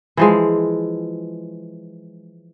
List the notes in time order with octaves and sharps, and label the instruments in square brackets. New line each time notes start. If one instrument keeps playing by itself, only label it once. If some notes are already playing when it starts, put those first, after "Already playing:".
[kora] E3 F3 G#3